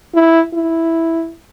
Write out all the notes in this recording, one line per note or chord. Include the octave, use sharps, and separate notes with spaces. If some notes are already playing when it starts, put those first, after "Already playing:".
E4
E4